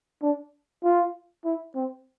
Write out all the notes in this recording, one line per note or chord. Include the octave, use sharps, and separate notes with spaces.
D4
F4
E4
C4